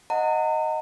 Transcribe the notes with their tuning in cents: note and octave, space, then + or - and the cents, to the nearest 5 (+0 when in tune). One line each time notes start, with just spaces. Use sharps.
D#5 +0 F#5 -15 A#5 -40